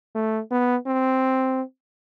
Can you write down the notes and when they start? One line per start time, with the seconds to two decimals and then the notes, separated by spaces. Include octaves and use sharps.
0.15 A3
0.51 B3
0.86 C4